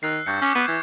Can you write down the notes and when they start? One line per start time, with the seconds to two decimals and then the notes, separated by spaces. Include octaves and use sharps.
0.03 D#3 E6 F#6 C7
0.26 G2 C#6 G6 C#7
0.41 C#4 C#6 D6 C#7
0.55 B3
0.68 E3 G#6